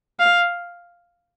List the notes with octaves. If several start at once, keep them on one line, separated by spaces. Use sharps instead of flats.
F5